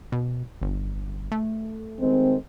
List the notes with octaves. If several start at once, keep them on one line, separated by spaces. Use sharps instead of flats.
B2
G1
A3
D#3 G#3 C4